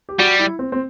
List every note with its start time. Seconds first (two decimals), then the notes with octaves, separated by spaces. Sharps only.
0.09 G4
0.19 G3 F#4
0.39 E4
0.59 C4
0.72 C4